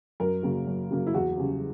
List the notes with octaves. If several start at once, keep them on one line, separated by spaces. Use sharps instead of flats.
F#2 A#4
C#3 F#3 A#3
F#2
C#3 F#3 A#3
E4
E2 F#4
C#3 G3 C#4